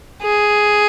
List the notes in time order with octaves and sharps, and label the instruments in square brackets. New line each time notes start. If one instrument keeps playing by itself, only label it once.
[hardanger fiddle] G#4